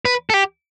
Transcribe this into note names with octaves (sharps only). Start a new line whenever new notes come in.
B4
A4
G4